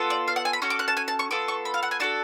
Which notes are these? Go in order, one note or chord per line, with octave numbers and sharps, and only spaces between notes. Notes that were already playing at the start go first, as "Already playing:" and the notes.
Already playing: B3 F4 A4
D5
F5
F#5
G#5
B5
C#4 F#4 A4 C#6
D6
F#6
A5
G#5
A5
C#6
B3 F4 A4 D6
C#6
B5
F5
F#5
G#5
D4 F#4 A4 A5